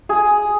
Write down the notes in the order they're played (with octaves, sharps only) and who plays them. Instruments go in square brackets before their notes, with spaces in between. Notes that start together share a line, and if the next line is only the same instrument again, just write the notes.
[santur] G#4